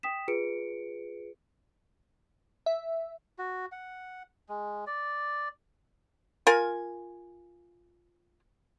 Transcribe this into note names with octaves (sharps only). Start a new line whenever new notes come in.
G5 D#6 B6 E7
F4 G#4 B4 C#7 D7
E5
F#4
F#5
G#3
D5
F4 A#4 G#5